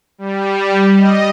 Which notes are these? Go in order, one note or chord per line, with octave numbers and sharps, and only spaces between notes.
G3
D#5